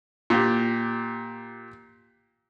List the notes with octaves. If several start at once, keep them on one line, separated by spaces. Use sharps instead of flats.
A#2 G4